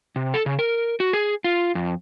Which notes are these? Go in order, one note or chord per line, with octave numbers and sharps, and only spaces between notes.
C3
A4
C#3
A#4
F#4
G#4
F4
F2